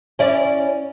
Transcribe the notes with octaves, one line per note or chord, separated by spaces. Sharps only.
C#4 E4 D5